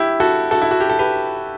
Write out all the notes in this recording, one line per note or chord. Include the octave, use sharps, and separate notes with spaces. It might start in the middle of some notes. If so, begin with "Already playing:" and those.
Already playing: E4 G4
F#4 A4
F#4 A4
E4
F#4
G4
A4
G4 B4